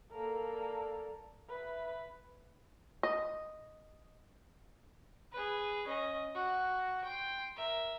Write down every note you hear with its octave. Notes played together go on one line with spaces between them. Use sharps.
A#3 A4 A#4 D5 A5
B4 E5
D#5
G#4 B4
C#4 D#5
F#4
G5 C6
A#4 E5